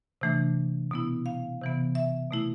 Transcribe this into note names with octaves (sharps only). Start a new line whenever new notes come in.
C3 E3 A3 D4
B2 B3 E4
F5
C3 E3 B3
E5
B2 A3 E4